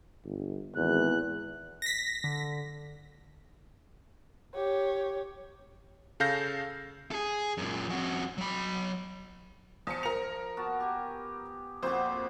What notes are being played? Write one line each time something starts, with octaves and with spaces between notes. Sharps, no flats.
G1
G#1 E2 F#6
A#6 B6
D3
G4 C#5
C#3 A4 F5 G6 A#6
G#4 A4
F#2 A#2
F2 F#4
F#3 B5
E2 F3 C#7
A#4 F7
B3 F#4 A5
G4 G#5
F2 A#2 F#4 C5 D6